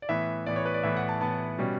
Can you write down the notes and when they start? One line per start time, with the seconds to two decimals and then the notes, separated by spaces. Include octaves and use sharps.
0.02 D5
0.09 A2 E3 B3 E5
0.46 A2 E3 B3 D5
0.56 C#5
0.65 B4
0.74 D5
0.83 A2 E3 B3 E5
0.97 F#5
1.09 A5
1.21 A2 E3 B3 A5
1.59 B2 G3 C#4